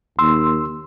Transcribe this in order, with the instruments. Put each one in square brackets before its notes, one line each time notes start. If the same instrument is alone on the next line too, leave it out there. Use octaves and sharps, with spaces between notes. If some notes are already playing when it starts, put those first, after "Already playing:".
[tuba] D#2 [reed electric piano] C6 E6